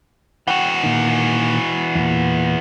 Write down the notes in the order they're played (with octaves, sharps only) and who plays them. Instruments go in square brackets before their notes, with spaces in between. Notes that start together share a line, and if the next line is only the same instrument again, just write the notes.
[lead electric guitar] E3 F#4 [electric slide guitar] F#5 G5
[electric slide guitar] A#2 D#3
E2 A#2